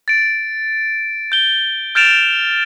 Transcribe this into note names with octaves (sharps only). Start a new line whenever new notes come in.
A6 D7
G6 G7
F6 G6 A6 D7 E7 F7